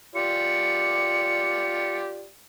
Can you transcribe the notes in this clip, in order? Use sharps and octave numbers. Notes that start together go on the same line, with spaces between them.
F4 G4 D5 C#7